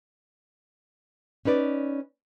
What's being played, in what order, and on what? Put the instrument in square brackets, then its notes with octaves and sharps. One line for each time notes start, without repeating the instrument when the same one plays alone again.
[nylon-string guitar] C#4 D#4 B4 D5